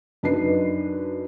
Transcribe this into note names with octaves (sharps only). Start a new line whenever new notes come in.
F#2 D4 D#4 B4 C7